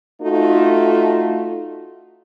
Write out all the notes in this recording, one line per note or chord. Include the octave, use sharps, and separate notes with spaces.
A3 D#4 F4 F#4 A4